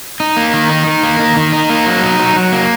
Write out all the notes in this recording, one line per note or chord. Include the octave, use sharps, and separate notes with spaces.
D#4
A#3
D#3
D#4
D#3
A#3
D#3
D#3
D#4
A#3
F#3
D#4
F#3
F#3
A#3